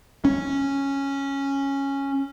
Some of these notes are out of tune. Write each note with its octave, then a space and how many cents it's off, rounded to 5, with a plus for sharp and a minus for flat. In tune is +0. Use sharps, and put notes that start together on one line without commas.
C#4 -5